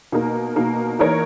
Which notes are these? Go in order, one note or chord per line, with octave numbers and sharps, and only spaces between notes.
B2 A#3 D#4 A#4
B2 A#3 D#4 A#4
E3 A#3 D#4 A#4 C#5